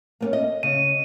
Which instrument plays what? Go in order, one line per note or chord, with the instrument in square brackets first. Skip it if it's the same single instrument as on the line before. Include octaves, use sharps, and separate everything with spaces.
[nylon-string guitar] A#3 B3 C#4
D#5
[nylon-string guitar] C#3 [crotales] D#7